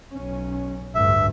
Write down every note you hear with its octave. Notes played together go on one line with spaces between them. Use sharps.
B1 C#4
A1 D2 G2 E5